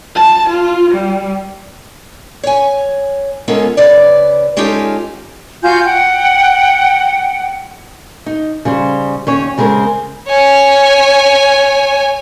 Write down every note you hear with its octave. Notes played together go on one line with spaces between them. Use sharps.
A5
F4
G3
C#5 G#5
G#3 B3 C#4 F4 A4 A#4
C#3 B4 D5
G#3 C#4 D#4 F4 G4 A4
F4 F#4 G#5 G6
F#5 G5
D#4
C#3 G3 C5
D#2 C#4 C#5
C#3 G#3 C4 G#4 A#4
C#5 G#5